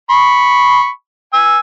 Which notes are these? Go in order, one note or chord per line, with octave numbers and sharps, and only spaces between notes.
B5 C#6
G#5 E6